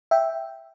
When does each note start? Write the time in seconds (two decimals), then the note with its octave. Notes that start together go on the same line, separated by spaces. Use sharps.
0.11 E5 G5